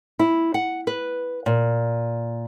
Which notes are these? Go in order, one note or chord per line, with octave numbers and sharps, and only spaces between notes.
E4
F#5
B4
A#2